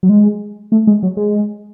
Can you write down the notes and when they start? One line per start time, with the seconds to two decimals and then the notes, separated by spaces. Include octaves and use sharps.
0.03 F#3
0.09 G#3
0.72 A3
0.87 G#3
1.03 F#3
1.17 G#3